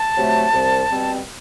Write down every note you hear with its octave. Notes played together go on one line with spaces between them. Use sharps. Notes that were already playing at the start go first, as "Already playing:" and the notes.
Already playing: A5
C3 F#3 A3
C2
B2 G3 C4